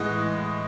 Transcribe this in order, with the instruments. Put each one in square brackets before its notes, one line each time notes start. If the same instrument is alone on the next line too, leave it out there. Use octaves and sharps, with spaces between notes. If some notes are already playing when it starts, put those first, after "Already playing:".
Already playing: [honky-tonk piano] A2 E3 G#3 D#5 F#5